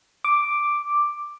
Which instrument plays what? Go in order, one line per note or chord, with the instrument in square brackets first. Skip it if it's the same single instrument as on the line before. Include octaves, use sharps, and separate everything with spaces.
[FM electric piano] D6